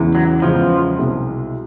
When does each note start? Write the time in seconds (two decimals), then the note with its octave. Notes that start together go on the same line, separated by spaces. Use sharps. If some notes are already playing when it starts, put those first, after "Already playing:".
Already playing: E2 C#3 E3 G#3
0.15 F#3
0.42 E2 C#3 E3 F3 G#3
0.98 C2 B2 G#3